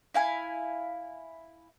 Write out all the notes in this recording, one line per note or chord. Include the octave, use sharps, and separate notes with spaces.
E4 F5 G#5